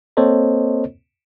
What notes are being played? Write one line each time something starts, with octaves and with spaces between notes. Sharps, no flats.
A#3 C4 A4 C5 C#5 D#5